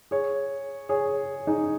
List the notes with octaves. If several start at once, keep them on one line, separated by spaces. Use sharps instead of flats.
G#4 C#5
G#4 C#5
D#4 G#4